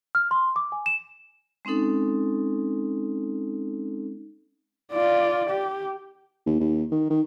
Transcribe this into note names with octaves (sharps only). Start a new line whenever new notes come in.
F6
C6
D6
G#5
E7
G#3 C4 C#4 D#4 A4
F4 D5
G4
D#2
D#2
D#3
D#3